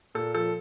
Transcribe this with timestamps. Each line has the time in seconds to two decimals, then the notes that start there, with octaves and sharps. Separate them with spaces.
0.15 A#2 A4
0.34 F3 A4